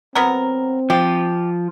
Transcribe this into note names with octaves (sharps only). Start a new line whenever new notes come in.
F#3 B3 C4 A#4
F3 G4